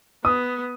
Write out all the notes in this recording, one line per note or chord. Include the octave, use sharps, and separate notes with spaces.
B3 D#6